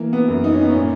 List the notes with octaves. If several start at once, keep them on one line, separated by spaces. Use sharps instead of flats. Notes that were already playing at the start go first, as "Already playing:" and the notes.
Already playing: E3 A#3
B3
F#2
D#4
C#4
B3
C#4
A#2